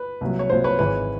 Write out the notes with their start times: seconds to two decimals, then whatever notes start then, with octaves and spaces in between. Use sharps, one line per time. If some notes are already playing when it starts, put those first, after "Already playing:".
Already playing: B4
0.21 C2 A#2 F#3
0.39 C#5
0.50 C2 A#2 F#3 C5
0.64 B4 C#5
0.79 G#1 G#2 E3 B4 C#5